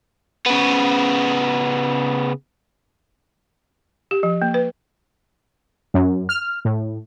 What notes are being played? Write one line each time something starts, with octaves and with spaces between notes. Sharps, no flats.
C#3 B3
G4
F3
A#3
B4
F#2
F6
A2